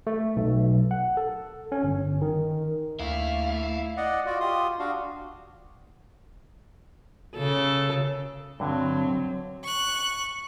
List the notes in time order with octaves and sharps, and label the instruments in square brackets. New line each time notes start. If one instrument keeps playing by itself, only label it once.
[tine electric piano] A3
B1
F#5
A4
C#4
G1
D#3
[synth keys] D2 [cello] A3 A#3 [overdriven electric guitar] E4 [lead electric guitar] F5
[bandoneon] D5 D#5 F#5
F4 F#4 D5
F4 G4 C6 D#6
D4 F#4 F5
[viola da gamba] C#3 A4
[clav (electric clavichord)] G2 D3 [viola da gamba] F#3 C4
[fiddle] C#6 F#6